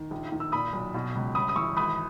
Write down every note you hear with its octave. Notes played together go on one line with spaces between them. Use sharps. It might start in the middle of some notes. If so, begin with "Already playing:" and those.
Already playing: D#3
A#1
D#3
E6
A#2 B5 D#6
B1
B2
C#2
G1 B5 D#6
D#6
E3 C#6 E6
G#1 B5 D#6